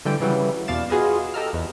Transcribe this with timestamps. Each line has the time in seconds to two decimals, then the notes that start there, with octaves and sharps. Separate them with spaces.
0.05 D3 E3 G3 G5
0.20 C#3 E3 F#3 G3
0.68 E2 B2 D5 F5 A6 E7
0.90 F4 F#4 G#4 B4 D#5
1.34 G4 A4 D#5 A#5 E6 F6
1.53 E2